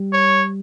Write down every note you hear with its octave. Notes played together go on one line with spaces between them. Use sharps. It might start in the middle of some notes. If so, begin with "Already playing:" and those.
Already playing: G3
C#5